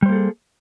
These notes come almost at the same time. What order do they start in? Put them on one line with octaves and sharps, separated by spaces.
G3 C5 A#3 A4 G#4